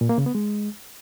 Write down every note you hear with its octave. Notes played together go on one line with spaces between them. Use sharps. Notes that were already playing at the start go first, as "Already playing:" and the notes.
A#2
A#3
C#3
B3
G#3